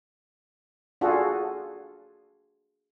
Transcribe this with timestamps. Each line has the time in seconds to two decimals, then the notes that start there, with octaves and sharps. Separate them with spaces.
1.01 D4 F4 F#4 G#4 A4